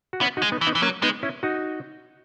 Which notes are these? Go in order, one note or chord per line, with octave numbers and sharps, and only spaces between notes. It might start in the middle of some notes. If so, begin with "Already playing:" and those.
F#4
B3 C#4 E4
D#4 F#4
G#3
B3 D#4
E3
B3 D#4
E3
F#3 A#3 C#4
G#3 B3 D#4
C#4 E4
D#4 F#4